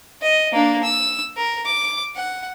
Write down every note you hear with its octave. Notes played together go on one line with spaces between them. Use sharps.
D#5
A#3 D4
E6
A#4
D6
F#5